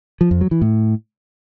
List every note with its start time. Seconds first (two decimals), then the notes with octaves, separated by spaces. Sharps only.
0.21 F3
0.31 F2
0.41 F#3
0.51 E3
0.62 A2